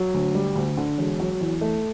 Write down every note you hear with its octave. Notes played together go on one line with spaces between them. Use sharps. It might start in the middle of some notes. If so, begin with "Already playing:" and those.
Already playing: F#3
D2
G3
D2
D3
E1
F#3
E2
A3